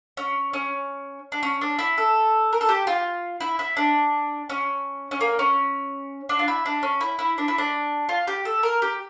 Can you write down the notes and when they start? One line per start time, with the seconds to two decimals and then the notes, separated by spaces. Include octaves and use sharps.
0.17 C#4
0.53 C#4
1.32 D4
1.43 C#4
1.61 D4
1.79 E4
1.98 A4
2.53 A#4
2.61 A4
2.69 G4
2.87 F4
3.40 E4
3.59 E4
3.77 D4
4.50 C#4
5.11 C#4
5.21 A#3
5.39 C#4
6.29 D4
6.39 F4
6.48 E4
6.65 D4
6.83 C#4
7.01 E4
7.19 E4
7.38 D4
7.48 E4
7.58 D4
8.09 F4
8.27 G4
8.45 A4
8.63 A#4
8.82 G4